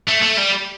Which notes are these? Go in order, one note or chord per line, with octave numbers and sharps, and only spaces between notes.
A3
A3
G3